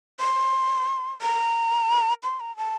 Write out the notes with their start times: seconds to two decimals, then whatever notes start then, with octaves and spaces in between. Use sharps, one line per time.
0.20 C6
1.22 A#5
2.23 C6
2.40 A#5
2.57 A5